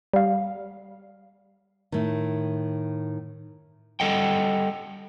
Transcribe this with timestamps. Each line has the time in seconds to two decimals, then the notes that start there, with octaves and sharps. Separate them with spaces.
0.13 G3 F5
1.92 A2 D#3
4.00 G3 A4 D#5 F#5 G5